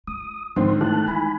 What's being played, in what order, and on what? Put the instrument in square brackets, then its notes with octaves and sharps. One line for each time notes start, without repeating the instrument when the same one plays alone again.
[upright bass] F4 [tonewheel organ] D#6
[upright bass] G#2 [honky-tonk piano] D3 D#3 C4 [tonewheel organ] F3 C6
[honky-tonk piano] D#3 E3 [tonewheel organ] A3 A5 F#6
[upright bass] G#3 D#4 [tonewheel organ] G#5 B5